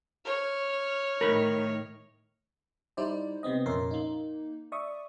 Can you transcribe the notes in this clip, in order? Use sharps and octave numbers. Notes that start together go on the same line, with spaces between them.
C#5 F6
A2 D#3 A#4 B5
G3 D#4 E4 C5 D5
C3 B3 C4 D#5
F2 A#2 C#4 A#4 E5 C6
A#3 D#4
D5 E5 C#6 D#6